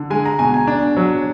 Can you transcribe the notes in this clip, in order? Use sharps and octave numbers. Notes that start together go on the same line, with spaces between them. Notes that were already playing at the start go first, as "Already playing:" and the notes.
Already playing: D3
G#3 G#5
A#5
B2 G#5
G#5
D4
F#3